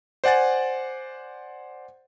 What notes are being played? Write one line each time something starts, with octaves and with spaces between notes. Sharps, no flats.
C5 D5 F#5 G#5 A6